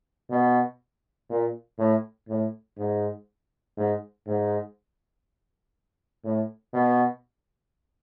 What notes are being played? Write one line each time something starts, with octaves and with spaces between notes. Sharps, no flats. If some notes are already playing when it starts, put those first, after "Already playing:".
B2
A#2
A2
A2
G#2
G#2
G#2
A2
B2